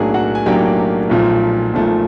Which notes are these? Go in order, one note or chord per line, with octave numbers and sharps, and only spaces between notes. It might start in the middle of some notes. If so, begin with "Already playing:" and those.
Already playing: B1 A2 F#3 A#3 D4 G#4 G#5
F#4 F#5
G#5
B1 A2 F#3 A#3 D4 G4 G5
B1 A#2 F3 A3
B1 A#2 F3 A3